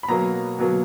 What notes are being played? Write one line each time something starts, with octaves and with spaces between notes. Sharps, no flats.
B5
B2 F#3 A#3 A#5
B2 F#3 A#3